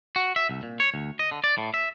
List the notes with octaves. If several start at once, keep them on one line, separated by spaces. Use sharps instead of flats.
F#4
E5
C2
A#2
C#5
D2
D#5
D3
D5
A2
E5